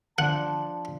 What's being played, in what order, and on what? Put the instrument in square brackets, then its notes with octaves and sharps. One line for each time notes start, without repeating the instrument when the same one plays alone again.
[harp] F3 D4 [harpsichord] F#5 [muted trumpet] A5